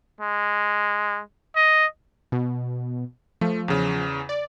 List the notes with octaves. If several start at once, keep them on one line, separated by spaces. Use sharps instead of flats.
G#3
D#5
B2
F3 A3
E2 C#3
D5